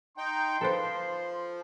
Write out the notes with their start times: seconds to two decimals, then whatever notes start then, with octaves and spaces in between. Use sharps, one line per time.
0.18 D#4 G5 C6
0.61 F3 A4 B4 C5